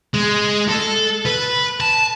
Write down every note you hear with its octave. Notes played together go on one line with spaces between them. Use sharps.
G#3
A4
B4
A5